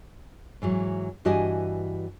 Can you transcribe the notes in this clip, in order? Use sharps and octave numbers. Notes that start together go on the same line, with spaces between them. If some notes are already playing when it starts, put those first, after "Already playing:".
G#2 E3 F#3
G2 E3 F#4 G4 D#5 G#5